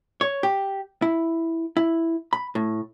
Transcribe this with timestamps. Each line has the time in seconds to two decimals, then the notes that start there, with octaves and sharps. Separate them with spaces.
0.21 C#5
0.43 G4
1.02 E4
1.77 E4
2.33 B5
2.55 A2